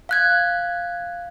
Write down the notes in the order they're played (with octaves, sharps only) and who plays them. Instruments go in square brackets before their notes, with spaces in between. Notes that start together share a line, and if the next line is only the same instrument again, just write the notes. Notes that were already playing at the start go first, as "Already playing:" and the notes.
[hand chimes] F5 F#6 G#6